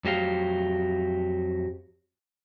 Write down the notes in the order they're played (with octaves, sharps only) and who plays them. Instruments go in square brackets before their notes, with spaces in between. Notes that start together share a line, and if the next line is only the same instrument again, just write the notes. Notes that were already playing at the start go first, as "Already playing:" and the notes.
[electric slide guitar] F2 F#3 G4 F5